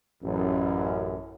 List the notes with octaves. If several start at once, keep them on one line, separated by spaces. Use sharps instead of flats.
A1 F#2